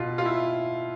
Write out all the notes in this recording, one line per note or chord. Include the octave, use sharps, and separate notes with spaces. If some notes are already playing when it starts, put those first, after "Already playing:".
Already playing: B2 F4
F4
E4